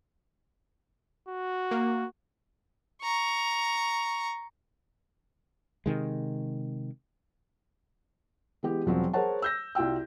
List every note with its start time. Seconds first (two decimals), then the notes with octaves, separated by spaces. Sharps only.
1.29 F#4
1.71 A#3
3.03 A#5 C#6
5.86 C3 D#3 G#3
8.63 E3 G#3 B3 G4
8.86 E1 F3 F#3 C4
9.13 G#4 A#4 C5 C#5 F#5 A5
9.42 E6 G6 A#6
9.75 C2 F4 F#4 G5 E6